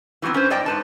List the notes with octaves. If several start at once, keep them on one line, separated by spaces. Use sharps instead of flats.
E3 F#3 G3 B3 C4
C#4 B4 C5
G2 D5 D#5 G5 A5
G#2 B4 A5